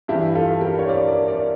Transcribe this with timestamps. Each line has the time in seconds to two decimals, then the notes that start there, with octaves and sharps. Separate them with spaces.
0.08 G2 E3 E4 G4
0.35 F4 A4
0.61 G4 A#4
0.79 C#5
0.89 A#4 D5
1.08 A#4 D5
1.28 A#4 D5